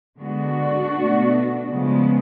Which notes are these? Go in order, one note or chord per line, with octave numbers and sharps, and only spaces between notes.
D3 G#3 B3 D4 F#4
B2 A3
C#3 F3 G#3 B3